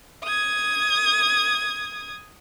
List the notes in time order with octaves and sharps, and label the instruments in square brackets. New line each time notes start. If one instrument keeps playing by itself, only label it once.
[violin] D#6 G#6